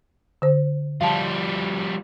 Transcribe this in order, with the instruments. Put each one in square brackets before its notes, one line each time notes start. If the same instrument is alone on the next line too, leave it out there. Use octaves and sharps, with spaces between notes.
[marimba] D3 C5
[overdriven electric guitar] F3 G3 [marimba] F5 A5